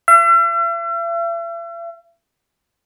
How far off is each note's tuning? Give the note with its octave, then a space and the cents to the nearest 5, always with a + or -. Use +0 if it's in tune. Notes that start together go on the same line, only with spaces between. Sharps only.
E5 +45